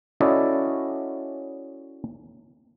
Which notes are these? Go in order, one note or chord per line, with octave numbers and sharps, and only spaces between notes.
C#4 E4 F#4 A4 D5 D#5